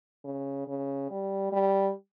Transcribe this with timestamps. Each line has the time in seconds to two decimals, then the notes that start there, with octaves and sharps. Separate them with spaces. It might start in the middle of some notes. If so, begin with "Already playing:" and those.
0.25 C#3
0.67 C#3
1.11 G3
1.52 G3